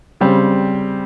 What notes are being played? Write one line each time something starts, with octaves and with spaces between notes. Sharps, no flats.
C#3 G3 C4